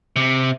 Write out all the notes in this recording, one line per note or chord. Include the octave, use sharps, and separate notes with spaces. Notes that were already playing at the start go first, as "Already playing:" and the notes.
C3